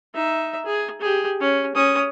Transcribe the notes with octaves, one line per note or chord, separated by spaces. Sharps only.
D#4 E5
G#4
G4 G#4
C#4
C#4 D#6